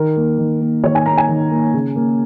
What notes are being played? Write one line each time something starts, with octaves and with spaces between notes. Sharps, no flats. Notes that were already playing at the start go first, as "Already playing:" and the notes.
Already playing: D#3 A#4
A#3
D#3
A#3
D#3 C#5
G#5
A#3 A#5
G#5
D#3
A#3
C#3
A#3